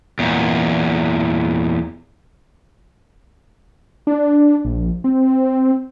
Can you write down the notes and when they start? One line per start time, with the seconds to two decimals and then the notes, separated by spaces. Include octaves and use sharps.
0.19 E2 A#2
4.07 D4
4.65 A#1
5.04 C4